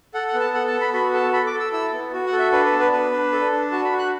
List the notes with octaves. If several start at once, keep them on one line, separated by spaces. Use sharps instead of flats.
A4 F#5
F#5
B3
A5
A4 F#5
A5
B3
B5
F#4 B5
A4 A5
A4 B5
D6
A4
E6
E4 E6
B3
F#4
F#5
A4
E5
D4 B4
B4
B3
B4
D4 B4
D4
A4
D4
F#4 A5
B5
F#4
F#6